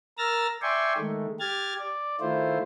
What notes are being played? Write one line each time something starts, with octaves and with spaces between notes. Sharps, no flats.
A#4 E6 F6 A6 A#6
D5 E5 G5 G#5 C6 C#6
D#3 G#3 A3
G4 F6 G#6 A6
D5
D#3 A3 E4 F4 C5